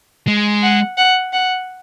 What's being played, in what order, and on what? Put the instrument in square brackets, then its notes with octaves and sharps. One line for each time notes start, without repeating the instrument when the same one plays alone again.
[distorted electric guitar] G#3
[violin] F#5
F#5
F#5